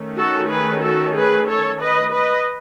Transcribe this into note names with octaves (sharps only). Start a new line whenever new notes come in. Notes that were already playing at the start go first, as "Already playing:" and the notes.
Already playing: D#3 A3 C#4
F#4 A4
G#4 B4
F#4 A4
G#4 B4
A4 C#5
B4 D#5
B4 D#5